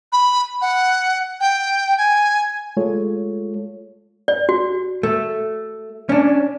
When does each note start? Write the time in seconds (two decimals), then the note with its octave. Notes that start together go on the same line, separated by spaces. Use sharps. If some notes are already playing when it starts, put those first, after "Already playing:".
0.12 B5
0.62 F#5
1.40 G5
1.98 G#5
2.77 G#3 A3 F4 A4 C#5
4.28 D5
4.49 F#4
5.03 A3
6.09 C#4 D4